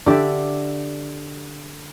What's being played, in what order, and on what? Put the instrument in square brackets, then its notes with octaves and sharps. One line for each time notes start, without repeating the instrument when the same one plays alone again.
[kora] D3 G4 D5 E5